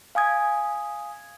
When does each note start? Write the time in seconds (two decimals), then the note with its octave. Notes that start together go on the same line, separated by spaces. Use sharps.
0.15 F5 G#5 D#6 G#6